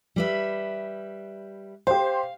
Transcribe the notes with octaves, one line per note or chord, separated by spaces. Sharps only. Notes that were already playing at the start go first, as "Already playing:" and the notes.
G3 B4 E5
G4 C5 F5